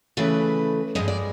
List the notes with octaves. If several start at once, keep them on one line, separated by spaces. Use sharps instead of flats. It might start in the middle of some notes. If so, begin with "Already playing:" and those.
C#3 E3 A3 B4
G2 E3 G#3 D#5
D5